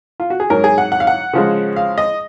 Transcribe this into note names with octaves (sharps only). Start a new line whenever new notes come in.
F4
F#4
G#4
G#2 F#3 C#4 A#4
G#4
F#5
F#5
F5
F#5
C#3 F3 G#3
F5
D#5